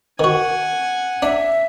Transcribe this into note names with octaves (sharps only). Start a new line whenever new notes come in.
D#3 F#4 F#5 G#5
D4 E5